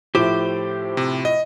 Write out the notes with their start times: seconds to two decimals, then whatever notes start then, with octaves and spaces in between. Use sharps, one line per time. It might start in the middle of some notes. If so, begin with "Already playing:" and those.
0.15 A2 F3 E4 G4 C5 D6
0.97 C3
1.25 D#5